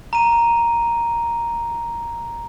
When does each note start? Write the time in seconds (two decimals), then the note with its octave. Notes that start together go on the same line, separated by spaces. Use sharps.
0.13 A#5 D#7